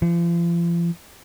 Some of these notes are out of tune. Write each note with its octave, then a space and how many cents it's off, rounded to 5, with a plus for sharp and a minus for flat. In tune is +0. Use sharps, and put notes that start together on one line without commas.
F3 -40